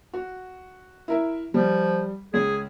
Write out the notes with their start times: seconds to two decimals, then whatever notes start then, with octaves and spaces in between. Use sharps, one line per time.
0.14 F#4
1.08 E4 A#4 E5
1.54 F3 G3
2.34 C#2 G#4